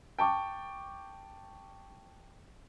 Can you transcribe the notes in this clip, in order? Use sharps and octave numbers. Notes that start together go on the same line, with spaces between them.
G5 A5 C#6 D6